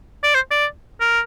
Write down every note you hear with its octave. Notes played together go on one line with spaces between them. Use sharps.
D5
C5
D5
A#4